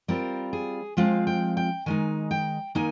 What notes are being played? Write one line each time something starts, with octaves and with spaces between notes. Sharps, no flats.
G3 C4 F4 A#4
G#4
F3 G#3 C4 F4 F5
G5
G5
D#3 G#3 D#4 G#5
G5
D#3 A#3 D#4 G#5